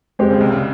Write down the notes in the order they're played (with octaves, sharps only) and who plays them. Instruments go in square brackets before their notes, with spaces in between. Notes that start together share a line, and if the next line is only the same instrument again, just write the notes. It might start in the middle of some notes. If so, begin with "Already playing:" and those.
[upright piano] G#3 C4 G4
[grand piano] C#2 C#3
C2 C3
C#3